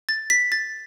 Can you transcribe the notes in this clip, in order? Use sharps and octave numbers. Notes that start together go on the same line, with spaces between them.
A6
B6
A6